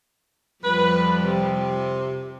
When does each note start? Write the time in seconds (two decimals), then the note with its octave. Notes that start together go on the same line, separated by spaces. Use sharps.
0.64 F2 F3 G3 B4
1.24 C3